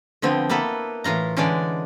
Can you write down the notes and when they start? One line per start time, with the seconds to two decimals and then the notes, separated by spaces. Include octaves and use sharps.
0.22 D3 F3 B3 C4
0.49 A#3 B3 E4 A4 B4
1.04 A2 E3 F4 A#5
1.37 D3 E3 G#3 C#4 D4 D5